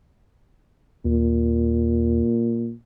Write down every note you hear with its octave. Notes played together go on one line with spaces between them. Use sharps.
D#2 A#2